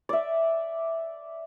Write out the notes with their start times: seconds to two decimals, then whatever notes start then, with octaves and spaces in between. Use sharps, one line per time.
0.09 D5 E5